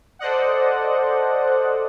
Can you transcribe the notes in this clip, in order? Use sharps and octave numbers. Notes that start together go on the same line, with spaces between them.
A4 C5 D5 D#5 F#5